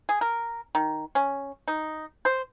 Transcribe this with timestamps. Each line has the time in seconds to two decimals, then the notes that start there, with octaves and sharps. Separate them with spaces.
0.09 G#4
0.21 A#4
0.75 D#3
1.15 C#4
1.68 D#4
2.25 C5